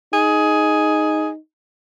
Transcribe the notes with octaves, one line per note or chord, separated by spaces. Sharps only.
D#4 G#4